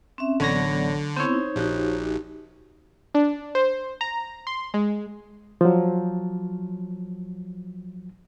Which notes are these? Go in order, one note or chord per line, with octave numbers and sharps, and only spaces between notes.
C4 C#4 E5
A1 D3 F#3 B3 C#5 D5 A#6
B3 C4 E4 C5 C#5
D#4
A#1 D#4 F#4 G4
D4
C5
A#5
C6
G#3
F3 F#3